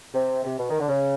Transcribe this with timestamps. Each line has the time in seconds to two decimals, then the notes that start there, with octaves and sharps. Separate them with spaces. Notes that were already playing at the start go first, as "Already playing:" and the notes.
0.14 C3
0.44 C3
0.59 B2
0.70 D#3
0.80 D3
0.88 C#3